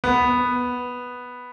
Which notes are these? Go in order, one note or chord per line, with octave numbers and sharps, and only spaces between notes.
B3